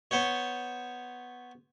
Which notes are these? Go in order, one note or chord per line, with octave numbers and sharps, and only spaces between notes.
B3 C5 C#5